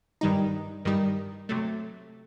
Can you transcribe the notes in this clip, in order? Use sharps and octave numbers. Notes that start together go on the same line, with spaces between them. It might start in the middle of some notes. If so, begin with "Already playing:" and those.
G2 D#3 G3 D#4
G2 D#3 G3 D#4
C3 F#3 A3